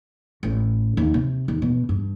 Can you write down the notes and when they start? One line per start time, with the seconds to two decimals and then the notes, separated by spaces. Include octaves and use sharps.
0.43 A1
0.97 D#2
1.14 C3
1.48 D#2
1.62 B2
1.89 G2